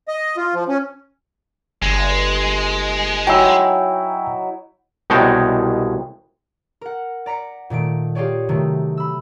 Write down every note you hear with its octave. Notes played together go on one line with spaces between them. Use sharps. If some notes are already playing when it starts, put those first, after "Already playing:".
D#5
F4
F3
C#4
G1 G#3
F#3 D#4 E4 G5 G#5 E6
C2 B2 G#3 C#5 G5 A5
A#4 F#5
D5 A#5 B6 C#7
A#2 D#3 A3 D7
F4 G4 G#4 C#5 D5
C3 D#3 F#3 A3
B5 E6